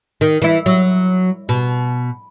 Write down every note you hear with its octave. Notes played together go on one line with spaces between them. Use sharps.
D#3
E3 E4
F#3
B2